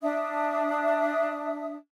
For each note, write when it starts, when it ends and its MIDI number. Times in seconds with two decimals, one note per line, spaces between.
0.02 1.75 62
0.02 1.75 76
0.02 1.75 87